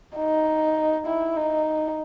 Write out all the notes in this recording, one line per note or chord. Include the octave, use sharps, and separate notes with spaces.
D#4
E4
D#4